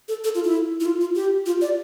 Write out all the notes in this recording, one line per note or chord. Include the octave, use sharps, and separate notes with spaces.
A4
A4
F4
E4
E4
F4
F4
G4
F4
D5